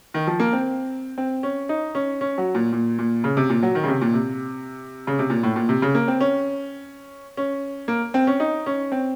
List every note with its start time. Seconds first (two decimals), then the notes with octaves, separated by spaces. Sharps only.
0.14 D#3
0.27 F3
0.40 A#3
0.53 C4
1.18 C4
1.43 C#4
1.69 D#4
1.95 C#4
2.21 C#4
2.38 F#3
2.55 A#2
2.73 A#2
2.99 A#2
3.24 C#3
3.37 C3
3.50 A#2
3.63 F#3
3.75 D#3
3.84 C#3
3.88 C3
4.01 A#2
4.14 C3
5.07 C#3
5.19 C3
5.30 A#2
5.43 A2
5.56 A#2
5.69 C3
5.82 C#3
5.95 A#3
6.08 C4
6.20 C#4
7.37 C#4
7.88 A#3
8.14 C4
8.27 C#4
8.40 D#4
8.66 C#4
8.92 C4